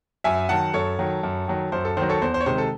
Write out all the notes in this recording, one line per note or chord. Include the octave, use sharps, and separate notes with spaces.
F#2 E5 G#5
D#3 F#3 F#5 A5
F#2 A4 C#5
D#3 F#3
F#2
D#3 F#3
F#2 C5
A4
D#3 F#3 C5
A4 C#5
E2 C5
C5
C#5
C3 D#3 G#3 C5
A4